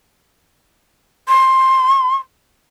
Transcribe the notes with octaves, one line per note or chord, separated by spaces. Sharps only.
C6